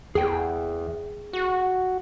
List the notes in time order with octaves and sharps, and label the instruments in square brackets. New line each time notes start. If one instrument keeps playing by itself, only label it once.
[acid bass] E2 [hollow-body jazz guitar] G#4 G5
[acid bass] F#4